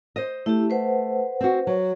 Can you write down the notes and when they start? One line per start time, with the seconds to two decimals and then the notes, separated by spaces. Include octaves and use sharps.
0.16 C5 D#5
0.46 A3 E4 G4
0.70 B4 C5 F#5
1.41 C4 F#4
1.67 F#3